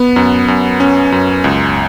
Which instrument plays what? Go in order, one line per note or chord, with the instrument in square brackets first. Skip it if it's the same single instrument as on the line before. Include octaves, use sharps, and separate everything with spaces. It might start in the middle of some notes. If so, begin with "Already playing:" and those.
Already playing: [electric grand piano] B3
F#2
F#2
C#4
F#2
C#2